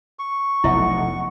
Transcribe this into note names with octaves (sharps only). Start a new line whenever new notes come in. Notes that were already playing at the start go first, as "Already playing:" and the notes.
C#6
F1 B1 F2 E4 E5 F#5